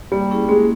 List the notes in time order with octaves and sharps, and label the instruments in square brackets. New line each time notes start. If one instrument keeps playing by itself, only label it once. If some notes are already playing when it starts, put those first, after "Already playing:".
[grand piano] G3 [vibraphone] A#3
[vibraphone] C#4 E4 G#4
[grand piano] G#3 [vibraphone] A#3